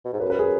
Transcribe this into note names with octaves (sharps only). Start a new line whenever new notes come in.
B2
G#2
F#2 B4
B4
G#4